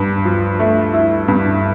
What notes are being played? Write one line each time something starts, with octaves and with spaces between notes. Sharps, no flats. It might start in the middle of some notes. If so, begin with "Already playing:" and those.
Already playing: G2
F3
A3
E4
G2